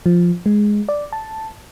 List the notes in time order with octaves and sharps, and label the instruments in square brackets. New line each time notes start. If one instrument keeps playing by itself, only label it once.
[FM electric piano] F3
G#3
D5
A5